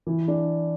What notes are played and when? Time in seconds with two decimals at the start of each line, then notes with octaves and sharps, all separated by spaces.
0.07 E3
0.28 D4